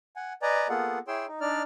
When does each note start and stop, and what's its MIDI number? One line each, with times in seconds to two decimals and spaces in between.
0.16 0.33 78
0.16 0.33 80
0.42 0.68 71
0.42 0.68 74
0.42 0.68 75
0.42 0.68 80
0.42 0.68 82
0.69 0.98 58
0.69 0.98 59
0.69 0.98 65
0.69 0.98 68
0.69 0.98 69
0.69 0.98 78
1.08 1.26 64
1.08 1.26 68
1.08 1.26 73
1.08 1.26 79
1.08 1.26 84
1.08 1.26 88
1.28 1.40 63
1.41 1.62 62
1.41 1.62 63
1.41 1.62 74
1.41 1.62 89